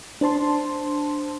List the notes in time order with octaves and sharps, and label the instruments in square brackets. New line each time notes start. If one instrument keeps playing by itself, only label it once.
[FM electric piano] D4 C5 A5 C6